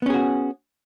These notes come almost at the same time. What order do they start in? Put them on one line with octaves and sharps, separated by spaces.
B3 C#4 G#4 F#4